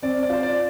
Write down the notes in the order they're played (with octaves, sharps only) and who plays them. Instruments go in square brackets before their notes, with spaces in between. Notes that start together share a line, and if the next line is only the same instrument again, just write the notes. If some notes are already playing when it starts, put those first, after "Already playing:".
[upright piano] C4 [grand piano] D5
[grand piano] D5
[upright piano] F4 [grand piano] C5
[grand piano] D5